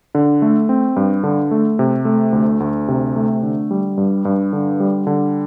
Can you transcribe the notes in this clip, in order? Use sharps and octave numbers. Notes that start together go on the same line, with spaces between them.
D3
A3
C4
G2
D3
A3
C3
A3
D2
D2
C3
A3
D3
G3
G2
G2
D3
G3
D3